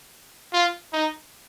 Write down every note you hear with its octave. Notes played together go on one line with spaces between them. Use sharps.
F4
D#4